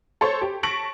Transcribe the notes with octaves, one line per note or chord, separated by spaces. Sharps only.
A4 C5 C#5 A5
G4
A5 C#6 A#6 B6 D7 F#7